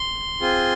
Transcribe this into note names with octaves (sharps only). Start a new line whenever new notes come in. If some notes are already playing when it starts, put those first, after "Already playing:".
Already playing: C6
C4 F4 G#4